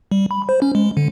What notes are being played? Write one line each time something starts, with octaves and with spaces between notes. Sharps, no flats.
G3
B5
C5
C#4
G#3
D3